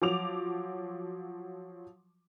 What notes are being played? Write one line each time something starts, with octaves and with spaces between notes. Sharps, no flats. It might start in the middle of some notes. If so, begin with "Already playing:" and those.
F3 F#3 D6 F7